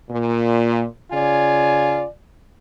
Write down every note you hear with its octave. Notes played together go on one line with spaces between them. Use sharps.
A#2
C#3 F4 D5 G#5